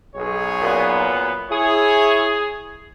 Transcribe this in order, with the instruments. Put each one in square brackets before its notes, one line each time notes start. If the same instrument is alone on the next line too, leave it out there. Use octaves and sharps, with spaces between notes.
[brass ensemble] B1 G#4 C#5
[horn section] F#2 A#2 B3
[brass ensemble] E4 C#5 [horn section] G#4